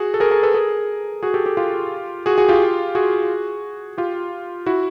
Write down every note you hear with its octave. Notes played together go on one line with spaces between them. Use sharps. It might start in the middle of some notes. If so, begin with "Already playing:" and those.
Already playing: F#4 G#4
A4
G#4 A#4
G#4 A#4
A4 B4
G#4 A#4
F#4 G#4
G4 A4
G4 A4
F4 G4
F#4 G#4
F#4 G#4
F4 G4
F#4 G#4
F4 G4
E4 F#4